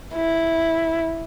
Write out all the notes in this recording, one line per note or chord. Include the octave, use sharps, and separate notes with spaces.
E4